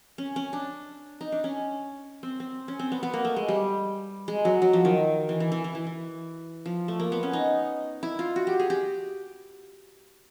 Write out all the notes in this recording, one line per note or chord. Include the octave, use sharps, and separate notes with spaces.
C#4
C#4
D4
D#4
D4
C#4
C4
C4
C#4
C4
B3
B3
A#3
A3
G#3
G3
G#3
F#3
F#3
F3
D#3
E3
E3
E3
E3
E3
E3
F3
A3
A#3
B3
C#4
D#4
E4
F4
F#4
G4
G#4
G4